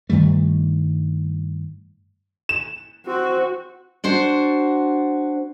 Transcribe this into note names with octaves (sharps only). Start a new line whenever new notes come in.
G2 D#3 G3 A3
E7
C4 F#4
D4 F#4 C5